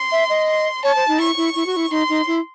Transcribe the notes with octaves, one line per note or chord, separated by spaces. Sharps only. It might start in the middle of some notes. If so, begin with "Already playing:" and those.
Already playing: C6
E5
D#5
C6
C#5 A5
C5
D#4
E4 C#6
E4
E4
F#4
E4
D#4 C6
D#4
E4